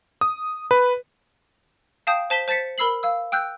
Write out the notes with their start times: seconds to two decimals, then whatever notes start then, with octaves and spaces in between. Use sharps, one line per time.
0.21 D#6
0.71 B4
2.07 F5 G5 A5 D#6 G6
2.30 C5 A5 B6 G7
2.48 C5 A5 A6 B6 C#7
2.78 A#4 B5 E6 C7 F#7
3.03 F5 E6
3.32 G5 E6 F#6 G6